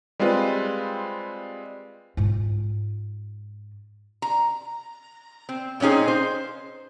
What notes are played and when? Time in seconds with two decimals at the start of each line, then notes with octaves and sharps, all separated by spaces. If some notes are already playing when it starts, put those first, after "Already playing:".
0.20 G3 G#3 C4 F4 B4
2.17 G#2 F4
4.22 A#5
5.49 C4
5.80 A#2 C4 C#4 D#4 G#4
6.08 C5